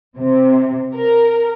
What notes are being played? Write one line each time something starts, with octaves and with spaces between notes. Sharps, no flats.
C3
A#4